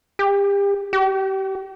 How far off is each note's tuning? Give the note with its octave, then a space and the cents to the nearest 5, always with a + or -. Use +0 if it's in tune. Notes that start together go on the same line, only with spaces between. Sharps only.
G4 +35
G4 -30